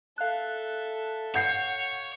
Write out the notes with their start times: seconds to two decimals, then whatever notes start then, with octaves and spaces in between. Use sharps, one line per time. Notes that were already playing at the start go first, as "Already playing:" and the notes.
0.18 A4 E5 F5 F#6
1.34 C#5 F#5 G6 C7